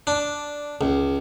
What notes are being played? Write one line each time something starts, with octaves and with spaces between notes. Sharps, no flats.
D4
C#2